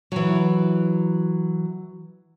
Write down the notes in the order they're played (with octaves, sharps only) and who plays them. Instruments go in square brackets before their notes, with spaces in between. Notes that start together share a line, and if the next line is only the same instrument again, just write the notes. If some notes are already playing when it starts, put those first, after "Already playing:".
[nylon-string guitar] E3 F#3